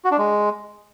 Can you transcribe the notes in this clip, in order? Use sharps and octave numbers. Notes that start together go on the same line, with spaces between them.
F#4
D4
G#3